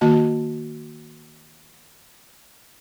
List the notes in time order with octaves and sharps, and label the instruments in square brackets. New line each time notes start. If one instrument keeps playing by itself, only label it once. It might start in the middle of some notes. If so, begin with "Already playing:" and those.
[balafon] D#3 A#3 F#4 D#5 A5